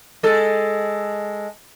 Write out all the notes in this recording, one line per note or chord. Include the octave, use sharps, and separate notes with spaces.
G#3 A4